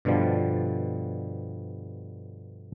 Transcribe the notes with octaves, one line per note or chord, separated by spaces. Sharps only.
G2 B2 D3 F3 G3